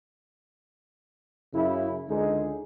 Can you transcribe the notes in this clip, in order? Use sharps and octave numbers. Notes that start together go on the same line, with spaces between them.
F#2 C#3 E4
C#2 D3 G#3 D#4 G#4